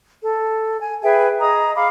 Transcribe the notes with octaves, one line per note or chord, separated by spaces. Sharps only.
A4
G#5
G#4 B4 E5 G5
G#4 D#5 A#5 D#6
F5 B5 D6